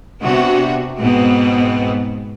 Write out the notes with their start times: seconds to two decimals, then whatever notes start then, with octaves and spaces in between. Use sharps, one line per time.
0.21 C3 B3 D4 F#4
0.99 G#2 B2 B3 C4